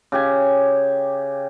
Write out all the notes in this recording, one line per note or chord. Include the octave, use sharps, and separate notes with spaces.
C#3 G4 G#5